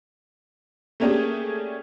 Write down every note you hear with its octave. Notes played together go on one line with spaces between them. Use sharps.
A3 A#3 C#4 D4 G4 G#4